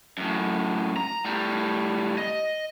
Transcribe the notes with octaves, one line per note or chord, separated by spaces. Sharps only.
F#2 A2
A#5
A2 G3
D#5